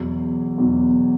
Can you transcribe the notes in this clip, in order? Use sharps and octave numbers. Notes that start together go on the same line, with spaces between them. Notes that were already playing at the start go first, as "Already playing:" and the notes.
Already playing: E2 B2 F#3
E2 B2 F#3